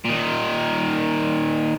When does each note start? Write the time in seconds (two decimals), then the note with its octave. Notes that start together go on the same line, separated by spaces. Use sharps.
0.05 A#2 D#3